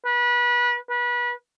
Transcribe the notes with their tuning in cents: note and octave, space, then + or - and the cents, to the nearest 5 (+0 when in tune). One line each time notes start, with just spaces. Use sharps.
B4 -30
B4 -30